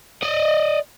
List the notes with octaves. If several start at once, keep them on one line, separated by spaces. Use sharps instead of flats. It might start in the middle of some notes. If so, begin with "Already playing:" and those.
D5 D#5